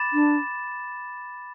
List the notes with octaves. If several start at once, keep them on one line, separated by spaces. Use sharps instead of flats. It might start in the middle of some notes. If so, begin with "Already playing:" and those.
Already playing: B5 D6 A6 E7
D4